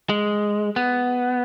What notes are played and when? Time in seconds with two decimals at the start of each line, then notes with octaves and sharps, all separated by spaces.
0.09 G#3
0.76 B3